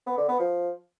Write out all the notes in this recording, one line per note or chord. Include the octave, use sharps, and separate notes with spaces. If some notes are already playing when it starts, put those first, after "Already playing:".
B3
D3
B3
F3